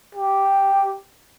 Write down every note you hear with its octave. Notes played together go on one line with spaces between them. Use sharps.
G4